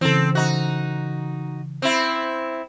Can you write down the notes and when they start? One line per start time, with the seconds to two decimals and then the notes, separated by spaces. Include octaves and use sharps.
0.01 C#3 E3 C4 A4
0.35 D#4 F#4
1.82 C4 E4